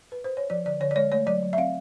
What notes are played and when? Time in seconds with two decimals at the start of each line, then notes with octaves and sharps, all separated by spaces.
0.12 B4
0.24 C5
0.37 C#5
0.50 F3 D5
0.65 D3 D5
0.80 D3 C#5
0.91 D5
0.96 G#3 C#5
1.12 A3 C#5
1.26 F#3 D5
1.43 F#3
1.53 E5
1.57 C4 F5